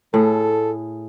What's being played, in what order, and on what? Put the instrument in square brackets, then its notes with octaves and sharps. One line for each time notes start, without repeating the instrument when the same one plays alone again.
[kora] A2 G#4 [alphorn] A4